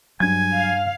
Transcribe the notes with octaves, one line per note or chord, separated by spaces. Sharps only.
G2 F#3 G#5 G#6
F5